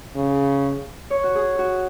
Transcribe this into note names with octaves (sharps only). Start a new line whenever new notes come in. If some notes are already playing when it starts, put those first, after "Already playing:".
C#3
C#5
F#4
G#4
F#4